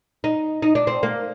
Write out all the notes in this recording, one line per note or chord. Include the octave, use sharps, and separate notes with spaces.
D#4
D#4
D4
C4
A#3